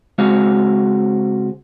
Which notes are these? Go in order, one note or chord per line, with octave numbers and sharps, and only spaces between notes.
C#2 G#3 C4 F#4 F5